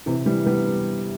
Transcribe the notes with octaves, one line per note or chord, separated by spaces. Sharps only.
C3 E3
E3 G3
G3 B3